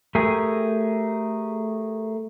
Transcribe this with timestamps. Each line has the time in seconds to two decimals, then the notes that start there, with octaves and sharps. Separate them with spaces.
0.15 A3 G4 G#4 A#4